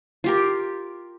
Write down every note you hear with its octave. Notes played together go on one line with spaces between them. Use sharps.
F4 G4 A#4